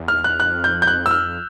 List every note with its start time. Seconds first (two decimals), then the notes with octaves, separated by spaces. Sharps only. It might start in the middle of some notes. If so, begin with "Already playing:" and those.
Already playing: E2
0.08 F6
0.24 F#6
0.40 F2 F#6
0.64 G6
0.82 G6
0.87 F#6
1.06 E6
1.11 F6